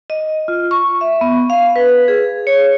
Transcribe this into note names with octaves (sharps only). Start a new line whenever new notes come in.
D#5
F4
C#6
E5
B3
F5
B4
G#4
C#5